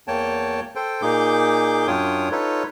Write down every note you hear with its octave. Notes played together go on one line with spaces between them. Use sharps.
E2 A#3 C#5 G5 A5
A4 C5 G5
A#2 A#3 D#4 G#4 D6 G6
F#2 D4 F4 C#5 G5 D#6
D#4 F4 A4 B4 C#5